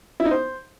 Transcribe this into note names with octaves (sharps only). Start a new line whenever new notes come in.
E4
D#4
C5